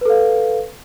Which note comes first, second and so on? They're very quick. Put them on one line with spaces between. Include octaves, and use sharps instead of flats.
B4 A4 F5